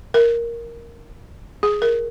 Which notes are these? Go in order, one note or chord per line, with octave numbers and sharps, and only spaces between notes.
A#4
G#4
A#4